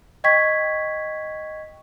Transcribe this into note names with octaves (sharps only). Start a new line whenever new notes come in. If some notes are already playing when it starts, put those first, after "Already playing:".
D#5 G5 C#6 G#6 B6